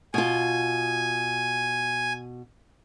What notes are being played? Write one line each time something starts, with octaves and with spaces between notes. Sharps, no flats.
B2 F4 G#5